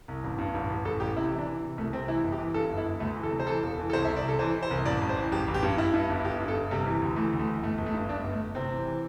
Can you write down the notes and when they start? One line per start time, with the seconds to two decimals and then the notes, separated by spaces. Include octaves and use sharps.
0.08 C2
0.24 A1
0.38 G2
0.55 A1
0.70 A1
0.85 A1 A4
1.00 A1 G4
1.16 C3 E4
1.32 E3
1.39 D4
1.47 E3
1.63 C3
1.78 C2 A3
1.93 C3 C4
2.08 E3 E4
2.24 G1
2.32 G4
2.39 E3
2.54 G2 A4
2.70 G1
2.78 E4
2.85 G1
3.00 D2 A3
3.17 E3
3.23 A4
3.31 C3
3.40 C5
3.47 E3 A4
3.63 E1
3.78 E3
3.90 A4
3.93 C2 C5
4.05 E5
4.09 C2
4.16 D5
4.24 C3 A4
4.39 E3 C5
4.54 E3
4.63 C5
4.71 C2
4.86 A1 D5
5.01 A1
5.09 C5
5.16 E3
5.32 A1 G4
5.48 A1
5.54 G4
5.63 G2
5.78 G2 E4
5.94 G2
6.10 G1
6.25 G1 G4
6.40 G2
6.48 A4
6.56 G1
6.71 C3 G3
6.86 E3
7.02 D2
7.16 E3 A3
7.33 D2
7.39 A3
7.48 E3
7.62 G1 A3
7.78 G1
7.86 A3
7.94 G2
8.09 G1 D4
8.24 G1
8.32 A3
8.41 G1
8.55 C3 C4
8.71 E3
8.86 E3